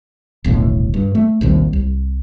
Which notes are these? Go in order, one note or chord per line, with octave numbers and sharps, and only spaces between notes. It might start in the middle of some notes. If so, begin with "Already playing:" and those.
D#1 B1 A2 D3
G2
A3
A#1 D#2 C3 G3
C2